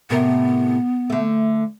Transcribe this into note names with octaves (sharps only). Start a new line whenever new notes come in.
A2 C3 B3 A#4
D3 A3